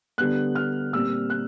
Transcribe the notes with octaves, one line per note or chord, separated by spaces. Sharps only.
D3 G3 B3 F#6
F6
A#2 G3 C4 E6
F#6